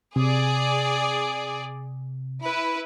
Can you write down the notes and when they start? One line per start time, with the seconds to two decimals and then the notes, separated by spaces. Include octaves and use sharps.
0.16 C3 G#4 D5
2.42 E4 B4